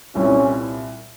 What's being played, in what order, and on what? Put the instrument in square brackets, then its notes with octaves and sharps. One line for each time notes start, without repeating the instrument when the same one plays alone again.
[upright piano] C2 A#2 G3 C4 E4 [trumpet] C#4